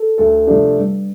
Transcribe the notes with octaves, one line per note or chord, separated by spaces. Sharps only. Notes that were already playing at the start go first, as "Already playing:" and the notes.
Already playing: A4
D2 A4
C3 F3 A3 D4 G4
G2 G4